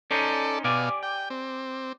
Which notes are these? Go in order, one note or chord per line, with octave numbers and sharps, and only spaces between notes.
C#4 D#4 A4 C5 D5
B2 G4 D5 F5 G#5
G5
C4